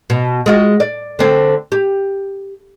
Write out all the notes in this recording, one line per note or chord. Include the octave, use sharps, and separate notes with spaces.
B2
G#3 F4 F#4
D5
D3 C4
G4